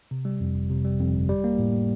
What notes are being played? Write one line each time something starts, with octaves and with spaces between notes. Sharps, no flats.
C3
G3
F2
G1
C3
G3
F2
G1
G3
A#3
A2